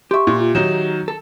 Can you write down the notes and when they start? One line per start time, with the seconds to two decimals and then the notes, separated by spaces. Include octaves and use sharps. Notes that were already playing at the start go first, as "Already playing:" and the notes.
0.11 G4 E5 C6 C#6
0.27 A#2
0.40 F4
0.55 D#3 F#3 D#4 E7
1.08 A4